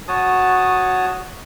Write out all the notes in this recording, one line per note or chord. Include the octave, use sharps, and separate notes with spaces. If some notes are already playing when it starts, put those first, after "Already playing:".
F#4 C#5 A5 D#6